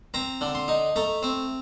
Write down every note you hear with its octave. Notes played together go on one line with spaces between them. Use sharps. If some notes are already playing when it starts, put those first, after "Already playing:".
C4 A#5
D3
C6
D#4
A3 A#5
C4